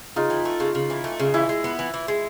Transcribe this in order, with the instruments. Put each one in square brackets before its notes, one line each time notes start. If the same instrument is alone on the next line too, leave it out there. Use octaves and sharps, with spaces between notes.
[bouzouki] C#3 [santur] D#4 F4
[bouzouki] E3
A3
C#3
C#3
E3
A3
C#3
[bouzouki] E3 [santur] E4
[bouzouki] G#3
B3
E3
E3
G#3